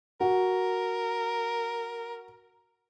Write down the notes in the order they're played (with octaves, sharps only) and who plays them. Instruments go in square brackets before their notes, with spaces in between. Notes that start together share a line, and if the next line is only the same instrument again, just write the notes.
[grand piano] F#4 [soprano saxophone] A#4